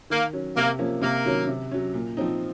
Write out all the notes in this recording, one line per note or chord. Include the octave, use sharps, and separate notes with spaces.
D#3 A#3
F#3 C#4
C3 A#3
F3 A#3 C#4
C3 A#3
D#3 F#3 C#4
C3
F#3 C#4
A#2
F3 C4 D#4